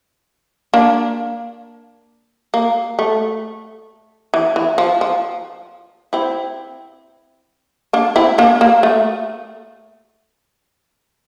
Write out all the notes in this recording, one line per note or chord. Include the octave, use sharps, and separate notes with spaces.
A#3 D4
A#3
A3
E3
E3
F3
F3
C4 E4
A#3 D4
C4 E4
A#3 D4
A#3
A3